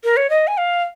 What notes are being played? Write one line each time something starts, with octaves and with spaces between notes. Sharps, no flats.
A#4
C#5
D#5
G#5
F5